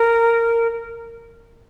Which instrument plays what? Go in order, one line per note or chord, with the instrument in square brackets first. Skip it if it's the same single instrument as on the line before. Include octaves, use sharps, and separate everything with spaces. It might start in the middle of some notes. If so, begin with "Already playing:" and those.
Already playing: [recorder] A#4